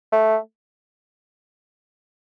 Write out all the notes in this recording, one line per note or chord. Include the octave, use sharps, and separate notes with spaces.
A3